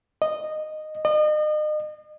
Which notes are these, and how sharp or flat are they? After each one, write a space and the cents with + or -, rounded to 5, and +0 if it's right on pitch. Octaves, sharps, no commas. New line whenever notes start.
D#5 -15
D#5 -40